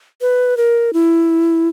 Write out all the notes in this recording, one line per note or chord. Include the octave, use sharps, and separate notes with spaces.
B4
A#4
E4